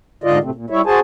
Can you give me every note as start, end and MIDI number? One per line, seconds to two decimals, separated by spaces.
0.24 0.39 44
0.24 0.39 50
0.24 0.39 65
0.24 0.39 74
0.24 0.39 75
0.43 0.51 45
0.43 0.51 48
0.43 0.51 57
0.43 0.51 60
0.55 0.66 46
0.70 0.81 55
0.70 0.81 64
0.70 0.81 73
0.70 0.81 76
0.86 1.00 66
0.86 1.00 68
0.86 1.00 72
0.86 1.00 80
0.86 1.00 81